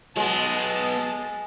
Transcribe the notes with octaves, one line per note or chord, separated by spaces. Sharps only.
F#3 G#3 B3 A5 D#6